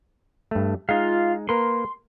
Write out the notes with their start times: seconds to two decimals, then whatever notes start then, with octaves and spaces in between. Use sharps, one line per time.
0.51 G2 A3
0.89 G#3 D#4 F4 F5
1.49 A#3 A#4 B4 C6